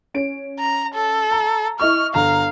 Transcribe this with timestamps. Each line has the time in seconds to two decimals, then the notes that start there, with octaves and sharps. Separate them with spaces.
0.14 C#4 D7
0.60 A#5
0.94 A4
1.31 A#5
1.80 E4 D#5 C#6 F6
2.14 G1 F5 A#5